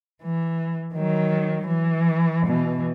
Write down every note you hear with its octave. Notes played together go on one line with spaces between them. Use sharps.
E3
D#3 F#3
E3
B2 E3